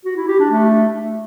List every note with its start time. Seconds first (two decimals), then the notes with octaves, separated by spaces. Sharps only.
0.05 F#4
0.17 E4
0.28 G4
0.39 D4
0.51 A3